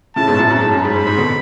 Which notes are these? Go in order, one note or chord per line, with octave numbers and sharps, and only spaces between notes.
A2 C#3 A5
G#2 B2
F#2 A2
F#2 A5
G#2
F#2
G#2 B5
G#2
G#2
B2 D3